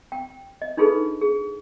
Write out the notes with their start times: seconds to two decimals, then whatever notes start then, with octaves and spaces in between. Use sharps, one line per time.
0.12 G5
0.62 D#5
0.77 D4 D#4 F4 G#4 A4 B4
1.21 G#4